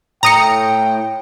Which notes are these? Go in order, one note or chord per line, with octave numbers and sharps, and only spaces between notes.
A2 G5 A#5 D#6 C#7